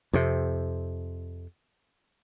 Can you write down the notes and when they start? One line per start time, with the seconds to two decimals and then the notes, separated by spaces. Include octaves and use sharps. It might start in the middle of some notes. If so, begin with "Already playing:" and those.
0.13 F2 C3